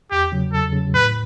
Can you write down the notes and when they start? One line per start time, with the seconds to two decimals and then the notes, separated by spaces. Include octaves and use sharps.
0.11 E2 G4
0.32 C#3 F#3
0.53 E2 A4
0.73 C#3 F#3
0.93 A2 B4